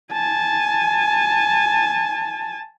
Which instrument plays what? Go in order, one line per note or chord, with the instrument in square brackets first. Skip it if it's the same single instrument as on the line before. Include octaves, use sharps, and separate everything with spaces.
[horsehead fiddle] G#5 A5